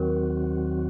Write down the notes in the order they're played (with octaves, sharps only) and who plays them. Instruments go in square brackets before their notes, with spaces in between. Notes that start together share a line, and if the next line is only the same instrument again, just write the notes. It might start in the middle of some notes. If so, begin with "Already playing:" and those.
Already playing: [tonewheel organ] D#2 D#3 F#3 C4 F#4 [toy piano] A#4